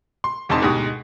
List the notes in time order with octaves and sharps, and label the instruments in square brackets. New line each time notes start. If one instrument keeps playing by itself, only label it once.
[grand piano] C6
E1 E2 C4 D#4 A5 C6
D2 G#2 B2 G#3 G4 D#6